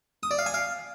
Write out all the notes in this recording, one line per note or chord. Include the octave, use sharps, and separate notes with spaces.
D#6
D5
F5
G#5
F5